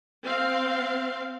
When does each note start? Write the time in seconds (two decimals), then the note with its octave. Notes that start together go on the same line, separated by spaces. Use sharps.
0.23 C4 F5